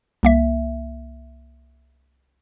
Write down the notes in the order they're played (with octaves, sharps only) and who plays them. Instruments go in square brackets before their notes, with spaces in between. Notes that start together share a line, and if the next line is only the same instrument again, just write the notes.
[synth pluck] C2 A#3 E5